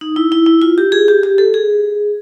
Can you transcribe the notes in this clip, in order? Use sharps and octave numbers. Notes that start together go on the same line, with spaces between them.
D#4
E4
E4
E4
F4
G4
G#4
G4
G4
A4
G#4